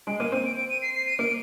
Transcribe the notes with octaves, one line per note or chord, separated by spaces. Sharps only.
G#3 D7
A#3 D#7
C4 D#7
D7
D7
D#7
C7
C7
D#7
A#3 D7